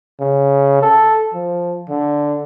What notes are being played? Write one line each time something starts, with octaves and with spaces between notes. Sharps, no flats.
C#3
A4
F3
D3